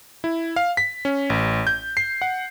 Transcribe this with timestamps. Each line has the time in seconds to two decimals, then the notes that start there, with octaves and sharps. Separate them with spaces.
0.24 E4
0.56 F5
0.77 B6
1.05 C#4
1.30 A1
1.67 G6
1.97 C7
2.22 F#5